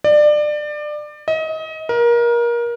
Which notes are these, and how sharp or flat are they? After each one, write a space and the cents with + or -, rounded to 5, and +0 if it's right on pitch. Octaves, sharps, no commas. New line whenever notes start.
D5 +25
D#5 +30
A#4 +25